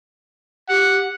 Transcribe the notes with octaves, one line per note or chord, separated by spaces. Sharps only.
G4 F#5